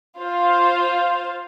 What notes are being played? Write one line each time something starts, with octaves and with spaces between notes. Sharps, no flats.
F4 C5 F5